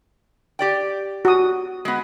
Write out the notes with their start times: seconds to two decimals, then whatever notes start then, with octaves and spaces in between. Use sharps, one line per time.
0.59 G4 D5 G5
1.25 F#4 D#6
1.85 G#3 B3